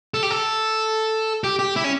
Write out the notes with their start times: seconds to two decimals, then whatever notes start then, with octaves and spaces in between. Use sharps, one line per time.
0.14 A4
0.23 G4
0.31 A4
1.44 G4
1.59 G4
1.76 E4
1.84 C#4